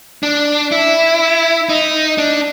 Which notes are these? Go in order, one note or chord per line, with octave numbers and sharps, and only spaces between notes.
D4
E4
D#4
D4